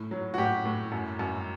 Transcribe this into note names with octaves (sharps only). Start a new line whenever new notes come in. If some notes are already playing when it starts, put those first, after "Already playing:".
Already playing: A2
F#3
F#4
A2 G4
A2
F#2
F#2